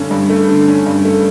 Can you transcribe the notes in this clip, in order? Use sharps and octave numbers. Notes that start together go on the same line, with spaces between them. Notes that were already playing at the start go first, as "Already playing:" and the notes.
Already playing: G2 D3 A3 C#4
G2
A3
D3
C#4
G2
A3